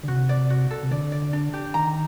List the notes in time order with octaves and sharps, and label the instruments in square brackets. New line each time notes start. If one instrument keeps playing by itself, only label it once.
[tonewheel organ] D3
[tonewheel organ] C3 [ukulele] F#4
[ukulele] D5
F#4
A4
[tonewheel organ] C3
[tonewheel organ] D3 [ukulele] D5
[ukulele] D5
D4
G4
[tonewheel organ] D#3 [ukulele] A#5